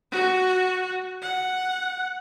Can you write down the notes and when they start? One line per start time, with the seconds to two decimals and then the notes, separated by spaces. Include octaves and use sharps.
0.12 F#4
1.22 F#5